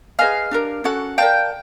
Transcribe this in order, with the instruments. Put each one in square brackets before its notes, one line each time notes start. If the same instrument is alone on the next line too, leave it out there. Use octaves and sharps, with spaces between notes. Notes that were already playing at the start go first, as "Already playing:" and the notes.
[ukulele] G#4 B4 D#5 G#5 [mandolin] F5
[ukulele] D4 G4 A#4
[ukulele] C#4 F#4 A4 [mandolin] F#5
[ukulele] A#4 D5 F5 A5 [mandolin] G5